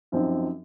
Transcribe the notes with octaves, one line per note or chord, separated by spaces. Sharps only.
F#2 F3 C4 D#4